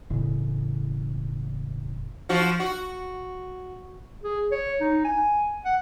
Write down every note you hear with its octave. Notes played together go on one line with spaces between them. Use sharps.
E1 A2 C#3
F3 F#4
F#4
G#4
C#5
D#4
G#5
F#5